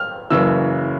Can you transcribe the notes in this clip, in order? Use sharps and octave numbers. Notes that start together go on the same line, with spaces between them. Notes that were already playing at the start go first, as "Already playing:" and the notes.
Already playing: F6
F#1 F#2 C#3 E3 E6